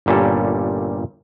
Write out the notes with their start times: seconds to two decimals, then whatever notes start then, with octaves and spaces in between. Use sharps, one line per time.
0.06 G1 A#2 G3 C#4 A4